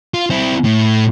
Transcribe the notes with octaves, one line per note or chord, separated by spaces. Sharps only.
F4
C4 E4
A2